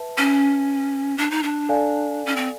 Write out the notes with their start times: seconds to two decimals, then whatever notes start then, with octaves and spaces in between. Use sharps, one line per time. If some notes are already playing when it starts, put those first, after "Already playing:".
Already playing: B4 E5 A5
0.18 C#4
1.18 D4
1.31 D#4
1.43 D4
1.69 A4 D5 F5 G#5
2.26 C#4
2.36 C4